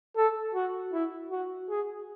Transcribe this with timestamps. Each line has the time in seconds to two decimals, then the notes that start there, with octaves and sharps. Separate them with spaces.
0.17 A4
0.55 F#4
0.93 E4
1.31 F#4
1.70 G#4